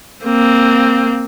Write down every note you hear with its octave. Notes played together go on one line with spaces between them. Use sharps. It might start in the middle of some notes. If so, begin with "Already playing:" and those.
A#3 C4